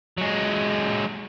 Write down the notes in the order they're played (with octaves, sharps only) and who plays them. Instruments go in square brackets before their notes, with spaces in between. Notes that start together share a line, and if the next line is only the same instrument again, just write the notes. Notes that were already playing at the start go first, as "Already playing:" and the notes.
[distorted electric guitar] F#3 G#3